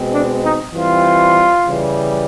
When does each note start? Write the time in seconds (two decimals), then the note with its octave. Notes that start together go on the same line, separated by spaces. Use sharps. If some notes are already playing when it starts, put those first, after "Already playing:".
Already playing: B2 G#3 C4
0.11 D4
0.43 D#4
0.74 E3 G3 C4 F4
1.67 C#3 E3 G3